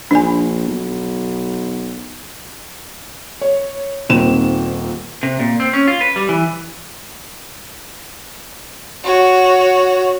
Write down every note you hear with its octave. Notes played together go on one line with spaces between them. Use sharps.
A#1 D4 G#5
B1
C#5
D#1 A#2 D#3 C4 E7
C3
A#2
C4
C#4
F4
B4
G3
E3
F#4 C#5